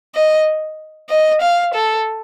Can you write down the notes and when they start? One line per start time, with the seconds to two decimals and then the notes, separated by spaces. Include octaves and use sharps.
0.15 D#5
1.10 D#5
1.41 F5
1.74 A4